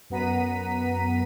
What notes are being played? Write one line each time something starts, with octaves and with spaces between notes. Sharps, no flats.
F#2 B3 F#5 A#5 B6 D#7